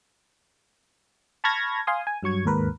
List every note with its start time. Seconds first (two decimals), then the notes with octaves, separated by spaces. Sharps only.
1.44 A5 B5 C#6 F6 G#6 A#6
1.87 F5 G#5 C6 D#6
2.07 G#5
2.23 G2 F#3 C#6 G#6
2.45 D#2 G#2 A#4 B4